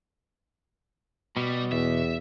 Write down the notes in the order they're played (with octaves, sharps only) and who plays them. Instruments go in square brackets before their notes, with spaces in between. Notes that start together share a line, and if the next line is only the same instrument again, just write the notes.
[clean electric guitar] B2 [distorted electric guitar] G3
[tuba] E2 [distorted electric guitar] E5